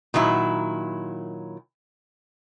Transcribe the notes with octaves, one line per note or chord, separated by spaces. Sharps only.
A#2 D#3 F#3 E4